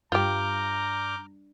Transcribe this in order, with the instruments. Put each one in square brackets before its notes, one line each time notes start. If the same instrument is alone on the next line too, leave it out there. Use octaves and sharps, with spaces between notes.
[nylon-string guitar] G2 [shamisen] F4 G4 [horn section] A#5 [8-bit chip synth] D6 F6 G6